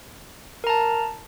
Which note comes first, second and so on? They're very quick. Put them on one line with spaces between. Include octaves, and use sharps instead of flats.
A#4 A#5 A5